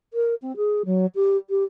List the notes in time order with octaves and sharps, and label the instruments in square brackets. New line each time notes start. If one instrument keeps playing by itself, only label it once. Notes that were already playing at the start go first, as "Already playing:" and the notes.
[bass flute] A#4
C4
G#4
F#3
G4
G4